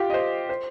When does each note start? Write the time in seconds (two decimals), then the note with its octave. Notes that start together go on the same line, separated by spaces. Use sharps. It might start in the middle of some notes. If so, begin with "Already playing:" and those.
Already playing: F4 G4
0.10 D#5
0.14 C5
0.49 C5